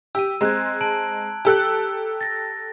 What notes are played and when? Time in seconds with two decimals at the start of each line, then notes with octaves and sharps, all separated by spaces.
0.15 G4 E6 D#7
0.41 G#3 C4 A#5 F#6 G#6
0.81 A5 D7 F#7
1.45 G4 A4 F#6
2.21 A6 A#6